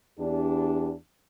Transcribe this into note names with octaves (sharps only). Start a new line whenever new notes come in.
E2 D4 G4